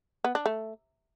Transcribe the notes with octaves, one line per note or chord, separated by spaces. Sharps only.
B3
D4
A3